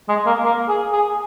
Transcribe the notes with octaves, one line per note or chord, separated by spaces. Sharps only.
G#3
A#3
A#3
G#4
G#4